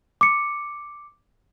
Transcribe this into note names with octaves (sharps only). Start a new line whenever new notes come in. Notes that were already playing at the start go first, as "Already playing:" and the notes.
D6 C#7